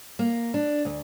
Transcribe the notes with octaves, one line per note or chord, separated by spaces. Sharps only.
A#3
D4
D2